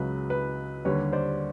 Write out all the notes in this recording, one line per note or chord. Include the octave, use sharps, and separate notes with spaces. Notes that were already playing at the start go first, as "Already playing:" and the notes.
Already playing: C#2 C#3 F#3 B4
B4
D#2 D3 G3 B4 C#5
C5 D5